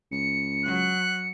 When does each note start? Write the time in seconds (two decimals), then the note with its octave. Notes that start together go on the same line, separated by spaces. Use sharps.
0.11 C#2 C#7
0.65 F#3 F#6